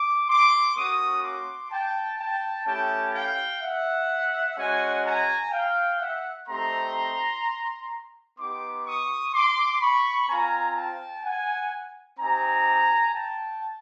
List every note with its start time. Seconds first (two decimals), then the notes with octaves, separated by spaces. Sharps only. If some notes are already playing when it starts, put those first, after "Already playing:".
Already playing: D6
0.28 C6 D6
0.76 A#3 C#4 F#4 C#6 D#6
1.24 C6 D6
1.71 G5 A5
2.19 G5 A5
2.67 A3 C#4 E4 G4 G5 A5
3.14 F5 G5
3.62 E5 F#5
4.58 G#3 C#4 F#4 F#5 G#5
5.05 G#5 A#5
5.52 F5 G5
6.00 E5 F#5
6.48 A3 C4 D#4 G4 A#5 C6
8.38 B3 D#4 G4 C6 D6
8.86 C#6 D#6
9.34 C6 D6
9.81 B5 C#6
10.29 C4 F4 G#5 A#5
10.76 G5 A5
11.24 F#5 G#5
12.19 C4 D#4 G4 G#5 A#5
13.15 G5 A5